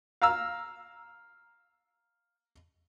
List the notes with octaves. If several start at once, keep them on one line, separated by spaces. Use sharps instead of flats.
F5 A#5 E6